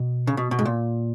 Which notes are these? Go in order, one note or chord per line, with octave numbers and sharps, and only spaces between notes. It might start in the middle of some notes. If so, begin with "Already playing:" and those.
Already playing: B2
C#3
B2
B2
G#2
A#2